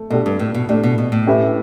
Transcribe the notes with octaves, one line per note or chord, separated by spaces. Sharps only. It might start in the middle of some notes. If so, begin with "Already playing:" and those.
Already playing: A3
B2 A3 D4 G4
G2
A2
B2
A2 A3 D4 G4
B2
B2
A2
A3 C#4 G4 B4 E5